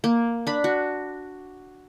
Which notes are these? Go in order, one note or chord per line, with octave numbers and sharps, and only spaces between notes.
A#3
D4 B5
F#4